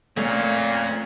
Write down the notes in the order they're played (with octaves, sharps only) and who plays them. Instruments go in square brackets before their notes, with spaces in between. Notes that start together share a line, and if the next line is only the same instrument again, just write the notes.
[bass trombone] A#2 [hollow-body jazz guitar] A3 C#4 [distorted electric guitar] C4 F5 [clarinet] C#5